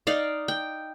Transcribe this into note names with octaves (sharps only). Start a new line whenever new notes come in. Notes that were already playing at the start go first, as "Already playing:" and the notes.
D#4 D5 F5
G5